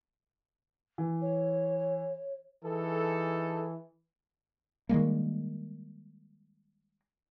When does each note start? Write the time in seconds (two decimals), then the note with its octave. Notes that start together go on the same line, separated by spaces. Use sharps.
0.98 E3
1.21 C#5
2.64 E3 D#4 G#4 A4
4.89 D#3 G3 G#3 A#3